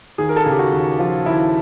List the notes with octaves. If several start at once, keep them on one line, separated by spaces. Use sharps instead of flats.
D#2 G#4
A#4
A4
C#3 G#4
G4
F#4
D#2
F3 F4
D#2 E4